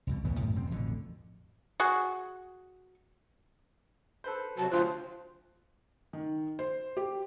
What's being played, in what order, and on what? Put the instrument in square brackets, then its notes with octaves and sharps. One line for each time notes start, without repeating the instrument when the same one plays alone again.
[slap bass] C2 F2 B2
A1 D#2 C#3 B3
F#2 A2 C3
D#1 F#2 C3 C4
A1 F2 B2 D3
[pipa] F#4 G#4
[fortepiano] A4 B4 C5
[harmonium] C3 F#3 F#4 [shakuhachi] A5
[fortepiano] D2 F#6 [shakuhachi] F4 [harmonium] C5
[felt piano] D#3
C5
G4